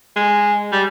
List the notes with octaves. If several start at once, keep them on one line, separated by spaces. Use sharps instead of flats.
G#3
G3